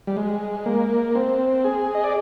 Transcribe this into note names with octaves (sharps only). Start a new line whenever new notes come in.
G3
G#3
A#3
C4
G#4
D#5
D5